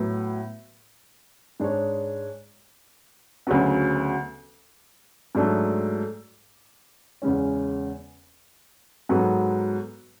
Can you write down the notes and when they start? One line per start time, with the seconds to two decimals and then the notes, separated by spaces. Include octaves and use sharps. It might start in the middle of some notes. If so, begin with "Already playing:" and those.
Already playing: A2 F#3 B3
1.60 G#2 G#3 D4 G#4 C#5
3.47 D2 C#3 F#3 B3
5.35 G#2 F#3 A3 D4
7.22 E2 C#3 G#3 C#4
9.09 G#2 F#3 B3 F#4 A4